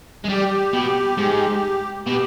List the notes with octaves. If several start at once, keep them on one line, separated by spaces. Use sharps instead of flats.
G#3
G3 G4
B2
G#2
B2 G4